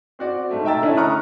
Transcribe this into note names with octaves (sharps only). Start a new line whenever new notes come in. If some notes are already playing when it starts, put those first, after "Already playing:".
C4 F#4 D5
G#2 A3
E5 G5 A#5 E6 A6
D3 A3 C#4 E4
A#5 B5 C#6 D#6 F6 F#6